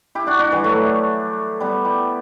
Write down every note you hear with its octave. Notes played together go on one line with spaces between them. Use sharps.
E4 G4
D4 F#4
D4 F#4
E3 G3
F#3 A3
G3 B3
E4 G4